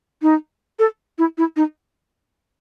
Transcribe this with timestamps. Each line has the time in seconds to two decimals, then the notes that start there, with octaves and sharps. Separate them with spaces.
0.22 D#4
0.79 A4
1.18 E4
1.38 E4
1.56 D#4